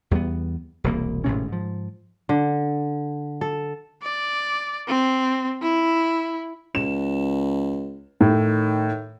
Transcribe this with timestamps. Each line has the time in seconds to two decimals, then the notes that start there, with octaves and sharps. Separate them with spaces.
0.11 E2 G3 G#3 B3
0.84 E1 C2 A#3
1.24 G#1 A2 C3 C#4
1.48 G#2 F3
2.29 D3
3.41 A4
4.03 D5
4.88 C4
5.62 E4
6.75 C#2 E7
8.21 A2 D#3